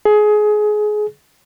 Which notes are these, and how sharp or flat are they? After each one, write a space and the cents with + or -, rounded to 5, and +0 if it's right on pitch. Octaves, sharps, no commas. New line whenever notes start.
G#4 +25